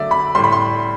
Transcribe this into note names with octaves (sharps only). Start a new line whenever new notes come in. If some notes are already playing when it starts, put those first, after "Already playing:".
Already playing: D3 F#3 A3 D5 E5
B5
A2 G3 C6
B5
C6